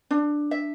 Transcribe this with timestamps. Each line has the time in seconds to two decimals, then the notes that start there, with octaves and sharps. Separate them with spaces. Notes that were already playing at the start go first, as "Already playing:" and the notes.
0.11 D4
0.51 E5